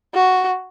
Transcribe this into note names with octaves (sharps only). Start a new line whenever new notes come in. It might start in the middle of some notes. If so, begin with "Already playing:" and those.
F#4